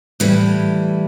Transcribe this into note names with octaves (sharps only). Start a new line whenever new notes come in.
A2 E3 G3